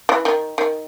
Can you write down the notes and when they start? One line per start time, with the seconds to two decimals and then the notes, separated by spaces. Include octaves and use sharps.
0.09 E3
0.25 D#3
0.58 D#3